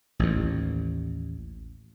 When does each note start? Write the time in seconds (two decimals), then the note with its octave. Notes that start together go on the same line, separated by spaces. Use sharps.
0.19 A1 D#2